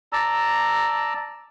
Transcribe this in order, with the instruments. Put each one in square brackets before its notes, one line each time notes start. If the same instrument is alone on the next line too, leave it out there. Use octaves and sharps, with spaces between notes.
[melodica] D5 A5 A#5 E6